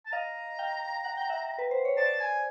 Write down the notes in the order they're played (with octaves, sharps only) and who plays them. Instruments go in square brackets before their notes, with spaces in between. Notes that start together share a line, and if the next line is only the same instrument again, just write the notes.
[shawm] A5
[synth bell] D#5 F5 [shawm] A#5
[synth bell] F5 G5
F#5
G5
E5 F#5
B4
C5
C#5
[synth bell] C5 D5 [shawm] A5
[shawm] G#5